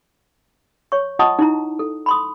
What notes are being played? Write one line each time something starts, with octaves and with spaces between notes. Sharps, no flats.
C#5 C#6
F4 D#5 F#5 A5 C#6 D#6
D#4 E4 A#5
A4
B5 C6 D#6